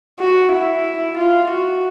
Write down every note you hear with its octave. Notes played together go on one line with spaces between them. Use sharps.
F#4
E4
F4
F#4